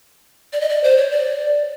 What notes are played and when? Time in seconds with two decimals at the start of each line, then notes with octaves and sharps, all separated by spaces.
0.53 D5
0.61 D#5
0.69 D5
0.84 C5
0.97 C#5
1.11 D5